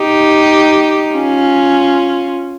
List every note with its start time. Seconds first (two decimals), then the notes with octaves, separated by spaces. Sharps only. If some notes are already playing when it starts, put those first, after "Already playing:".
Already playing: D#4 G4
1.14 C#4 F4